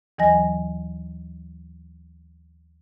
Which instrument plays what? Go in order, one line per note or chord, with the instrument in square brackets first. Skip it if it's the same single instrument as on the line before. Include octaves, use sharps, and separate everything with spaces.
[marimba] D#2 E3 F#3 D#5 G#5 A#6